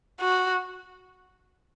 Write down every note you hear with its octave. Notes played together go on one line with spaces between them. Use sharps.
F#4